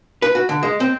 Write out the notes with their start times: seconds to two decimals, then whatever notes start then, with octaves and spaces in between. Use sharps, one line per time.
0.22 B4
0.35 F#4
0.49 D3
0.63 G#3
0.80 C4